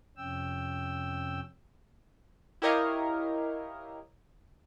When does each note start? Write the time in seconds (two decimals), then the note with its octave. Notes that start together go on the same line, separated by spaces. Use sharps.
0.17 F2 C3 C#4 G5 E6
2.62 E4 G4 A#4 C#5 D#5 F5